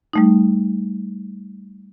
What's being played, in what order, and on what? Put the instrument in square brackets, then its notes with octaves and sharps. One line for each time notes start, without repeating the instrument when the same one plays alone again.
[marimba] G3 A3 D#4